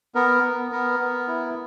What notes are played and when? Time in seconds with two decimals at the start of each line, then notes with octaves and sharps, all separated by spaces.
0.15 B3 A#4
0.43 B3
0.72 B3 A#4
1.00 B3
1.27 E4